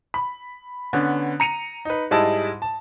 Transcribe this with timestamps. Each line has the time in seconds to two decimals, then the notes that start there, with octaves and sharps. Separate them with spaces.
0.14 B5
0.93 D3 B3 C#4
1.40 A#5 C#7 D#7 F7
1.85 D#4 B4
2.11 G#2 G3 G#3 E4 D#5 A5
2.62 A5